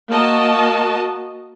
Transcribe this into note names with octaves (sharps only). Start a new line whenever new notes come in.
A#3 F#4 D#5 A5